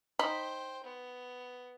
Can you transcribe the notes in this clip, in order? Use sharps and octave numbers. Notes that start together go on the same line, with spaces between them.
D#4 C5 G5 B5
B3